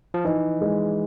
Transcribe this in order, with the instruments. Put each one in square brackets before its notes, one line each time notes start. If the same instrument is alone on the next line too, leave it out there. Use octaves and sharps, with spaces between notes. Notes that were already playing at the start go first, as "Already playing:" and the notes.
[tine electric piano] F3
[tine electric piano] E3 [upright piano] D#4
[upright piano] G#3